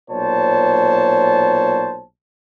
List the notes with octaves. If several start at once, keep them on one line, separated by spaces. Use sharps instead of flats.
B1 A#2 C5 C#5 A5